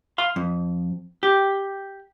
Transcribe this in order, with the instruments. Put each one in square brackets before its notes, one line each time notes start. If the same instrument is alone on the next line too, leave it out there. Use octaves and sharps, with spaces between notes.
[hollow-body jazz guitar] F5 C6
F2
G4